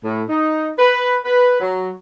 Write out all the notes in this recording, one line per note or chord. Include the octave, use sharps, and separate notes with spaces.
A2
D#4
B4
B4
F#3